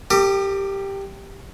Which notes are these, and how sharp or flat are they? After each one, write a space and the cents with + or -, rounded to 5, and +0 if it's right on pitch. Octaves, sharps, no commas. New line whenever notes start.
G4 +0 A#4 -45 D6 +45